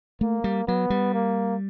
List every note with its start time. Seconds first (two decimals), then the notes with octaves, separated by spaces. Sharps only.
0.21 A3 A#3
0.44 G3
0.67 F#3 B3
0.90 G3
1.14 A#3